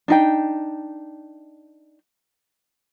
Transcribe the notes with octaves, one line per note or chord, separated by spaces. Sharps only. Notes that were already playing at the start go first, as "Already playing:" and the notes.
D4 D#4 G5